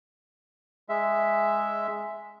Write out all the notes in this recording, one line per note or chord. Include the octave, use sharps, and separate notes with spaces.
G#3 E5